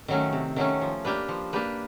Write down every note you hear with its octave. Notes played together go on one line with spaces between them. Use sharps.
D#3 F#3 A3 C#4
C3
D#3 F#3 A3 C#4
F3
A#3 D4 G4 B4
F3
A#3 D4 G4 B4